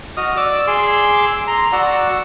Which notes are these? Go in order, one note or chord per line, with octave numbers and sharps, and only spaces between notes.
F#4 D#5 D#6 F6
D5 D6 E6
G#4 C6 D6 E6
A#5 C6
F#4 D5 F#5 E6